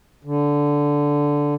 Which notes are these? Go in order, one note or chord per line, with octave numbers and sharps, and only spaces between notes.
D3